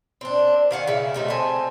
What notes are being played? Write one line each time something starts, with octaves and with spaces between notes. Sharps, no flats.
C4 D4
D#3 F5 F#5 G#5
C#3 E4
C3 A3 D#4
C4 E5 G#5 A5